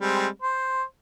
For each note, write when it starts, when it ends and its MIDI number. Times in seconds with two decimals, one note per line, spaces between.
0.01 0.27 55
0.01 0.27 56
0.01 0.27 60
0.42 0.83 72